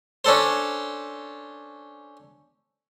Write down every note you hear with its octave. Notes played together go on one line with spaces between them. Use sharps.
C#4 D4 A4 C5